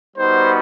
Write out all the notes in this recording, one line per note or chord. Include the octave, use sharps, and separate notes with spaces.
G3 B3 D#4 F#4 C5